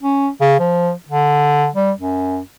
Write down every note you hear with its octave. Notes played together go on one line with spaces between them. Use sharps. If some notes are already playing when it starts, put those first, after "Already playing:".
C#4
C#3
F3
D3
G3
F#2